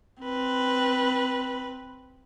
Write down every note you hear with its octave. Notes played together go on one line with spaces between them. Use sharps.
C4 B4